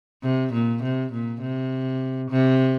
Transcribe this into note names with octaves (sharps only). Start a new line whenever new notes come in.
C3
A#2
C3
A#2
C3
C3